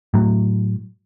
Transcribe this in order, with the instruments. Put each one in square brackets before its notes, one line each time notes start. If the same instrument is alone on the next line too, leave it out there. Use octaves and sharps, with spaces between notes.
[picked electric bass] A2 F#3